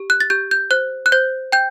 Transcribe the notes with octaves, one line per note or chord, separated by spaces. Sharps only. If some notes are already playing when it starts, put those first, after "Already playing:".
Already playing: G4
F#6
A6
G4 G6
G6
C5 F#6
F#6
C5 G6
G5 G6